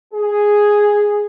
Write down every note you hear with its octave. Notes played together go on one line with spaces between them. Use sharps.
G#4